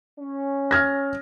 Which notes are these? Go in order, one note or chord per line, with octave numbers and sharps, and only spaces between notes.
C#4
F6 G#6 A#6